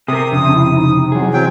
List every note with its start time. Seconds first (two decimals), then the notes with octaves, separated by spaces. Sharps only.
0.08 C3 G#4 A#4 D#6
0.32 F2 C#3 D4
0.54 E4
0.75 D#4
1.12 E3 F#3 G#4
1.34 F#3 C4 G5